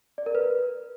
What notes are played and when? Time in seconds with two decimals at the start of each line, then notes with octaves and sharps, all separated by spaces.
0.18 D5
0.26 A#4
0.35 B4